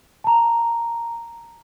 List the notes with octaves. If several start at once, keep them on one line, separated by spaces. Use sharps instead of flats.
A5 A#5